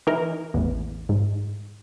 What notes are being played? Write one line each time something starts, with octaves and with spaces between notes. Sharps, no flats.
E3 D#4 A#4
A1 E2
G#2